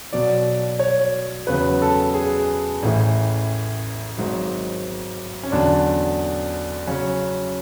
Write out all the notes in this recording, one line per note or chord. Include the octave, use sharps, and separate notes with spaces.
B1 B2 F#3 D5
C#5
E2 C#3 F#3 B4
A4
G#4
A1 A2 E3
G#1 G#2 F#3
C#4
E2 D3 F#3 D4
C#3 F#3 C#4